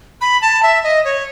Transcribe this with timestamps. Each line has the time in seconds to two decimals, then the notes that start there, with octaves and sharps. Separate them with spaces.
0.21 B5
0.42 A5
0.63 E5
0.84 D#5
1.05 C#5